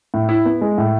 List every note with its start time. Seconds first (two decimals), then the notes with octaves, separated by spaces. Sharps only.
0.14 A2
0.29 E4
0.45 B3
0.61 G#3
0.78 A2